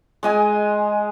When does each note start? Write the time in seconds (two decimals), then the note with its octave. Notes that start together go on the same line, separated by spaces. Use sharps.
0.23 G#3 D#5 G#5